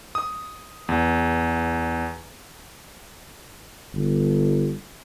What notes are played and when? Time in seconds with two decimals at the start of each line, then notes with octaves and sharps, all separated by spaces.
0.15 D#6
0.89 E2
3.94 G1